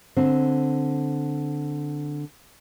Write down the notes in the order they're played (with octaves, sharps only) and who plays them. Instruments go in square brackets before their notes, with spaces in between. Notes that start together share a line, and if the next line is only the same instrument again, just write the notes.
[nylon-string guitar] D3 C4